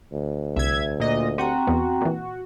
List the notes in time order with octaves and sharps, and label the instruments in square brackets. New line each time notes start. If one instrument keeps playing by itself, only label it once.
[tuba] D2
[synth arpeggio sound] C2 [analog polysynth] E5 G#6
[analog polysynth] A#2 D#5
[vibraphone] C4 G5 A#5 [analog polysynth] F#4 [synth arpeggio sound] G4
[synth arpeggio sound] E2 B3
A#2 E3